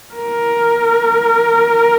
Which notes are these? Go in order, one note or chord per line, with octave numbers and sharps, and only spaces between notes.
A#4